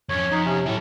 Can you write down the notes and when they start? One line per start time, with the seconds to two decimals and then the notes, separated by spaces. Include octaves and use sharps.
0.09 F2 C#4 C#5
0.32 F2 D#4
0.46 C3 C#4
0.66 A2 F#3 A4